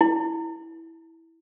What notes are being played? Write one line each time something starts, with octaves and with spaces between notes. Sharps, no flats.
E4